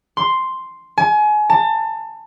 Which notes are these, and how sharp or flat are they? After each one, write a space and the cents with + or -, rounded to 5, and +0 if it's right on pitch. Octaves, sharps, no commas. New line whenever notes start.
C6 +0
G#5 +30
A5 +30